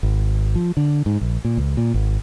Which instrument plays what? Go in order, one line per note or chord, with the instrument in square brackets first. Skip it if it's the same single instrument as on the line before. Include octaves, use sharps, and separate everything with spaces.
[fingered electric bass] G#1
F3
D3
G#2
A#1
A#2
C#2
A#2
G#1